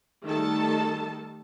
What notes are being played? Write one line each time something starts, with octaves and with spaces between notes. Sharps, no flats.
D#3 G3 A3 A4 A5